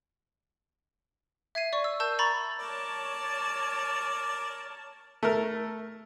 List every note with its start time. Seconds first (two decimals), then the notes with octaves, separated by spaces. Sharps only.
1.55 E5 G#6 C7 D#7
1.73 D5 C#6
1.84 E6
2.00 A#4 A5 E6 G6
2.19 A#5 B5 C#6 A6
2.60 A#4 C#5 D5 A5
5.23 A3 A#4